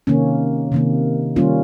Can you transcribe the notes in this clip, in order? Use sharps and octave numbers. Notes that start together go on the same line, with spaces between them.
C3 D#3 A#3 C#4
C3 D#3 A#3
D#3 G3 A#3 C#4 F4